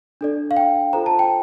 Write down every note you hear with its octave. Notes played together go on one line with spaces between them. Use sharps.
D4 A4 D5
F5
G5
F4 A4 C5 A#5
A5
G5